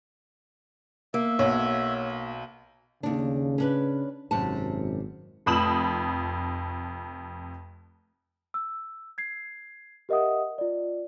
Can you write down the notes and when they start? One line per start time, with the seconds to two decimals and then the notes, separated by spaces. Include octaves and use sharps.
1.14 A#3 E5
1.39 B1 F#4 C#5
3.03 D#2 C#3 D4
3.58 C#4 D4 B4
4.31 G#1 F#2 C3 A5
5.46 F1 F2 B5 D#6 E7 F#7
8.54 E6
9.18 G#6 C7
10.09 G4 A#4 D#5 E5 F#5 D#6
10.58 F4 D5